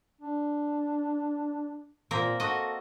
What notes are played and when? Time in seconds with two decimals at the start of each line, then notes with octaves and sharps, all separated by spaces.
0.21 D4
2.11 A#2 A#3 C4 A#4
2.40 F#4 A4 D#5